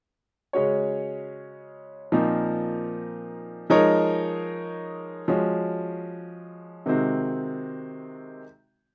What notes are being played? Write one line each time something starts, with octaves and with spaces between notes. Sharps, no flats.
C#3 G#3 C#4 F#4 C#5
A#2 F3 C4 D#4 A#4
F3 G#3 D#4 A#4 C#5
F3 G#3 C#4 F#4
C3 D#3 G#3 C4 F#4